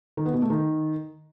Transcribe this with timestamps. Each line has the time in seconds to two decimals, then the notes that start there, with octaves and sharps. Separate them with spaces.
0.17 D#3
0.25 B3
0.34 B2
0.42 A3
0.50 D#3